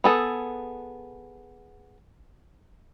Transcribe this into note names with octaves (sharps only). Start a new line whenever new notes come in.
B3 G#4 A4